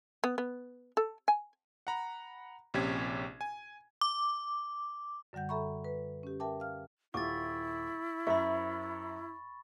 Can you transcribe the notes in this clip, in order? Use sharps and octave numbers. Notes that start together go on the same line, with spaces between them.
B3
B3
A4
G#5
F#5 A#5 B5
A#1 C3 C#4 G4 G#6
G#5
D6
F#2 D3 G3 F#5 G6
A4 E5 A#5 B5 C#6
B4
C#4 G4
A#4 E5 G5 A5 D6
F5 F6
D#1 E4 F4 C#6 D6 A6
F#2 C5 E5 B5 C#6